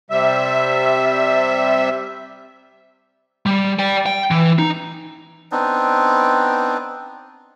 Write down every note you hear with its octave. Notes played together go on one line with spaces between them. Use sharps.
C3 G3 E5
G3
D5 G5
G5
E3
D#4
B3 C4 D4 D#4